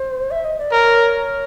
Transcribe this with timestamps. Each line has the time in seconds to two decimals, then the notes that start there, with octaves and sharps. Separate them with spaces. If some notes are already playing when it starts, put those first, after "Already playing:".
Already playing: C5
0.31 E5
0.45 D#5
0.59 D5
0.72 A#4 C#5